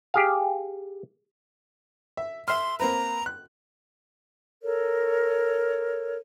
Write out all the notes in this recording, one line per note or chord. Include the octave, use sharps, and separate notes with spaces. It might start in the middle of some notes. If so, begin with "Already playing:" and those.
G4 G#4 F5
E5
E5 C6 F6
A#3 C4 B4 A#5
F#6
A4 A#4 C#5